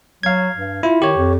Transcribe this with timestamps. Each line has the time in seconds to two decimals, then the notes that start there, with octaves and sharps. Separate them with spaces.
0.23 F#3 F5 G#6
0.55 G2
0.83 E4 F4
1.02 D#3 G4 C#5
1.17 F2